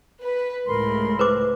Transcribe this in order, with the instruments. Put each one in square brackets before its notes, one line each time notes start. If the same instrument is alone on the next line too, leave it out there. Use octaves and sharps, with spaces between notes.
[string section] B4
[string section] C#2 A2 [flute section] A#4 B5 C6
[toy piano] B4 C5 D6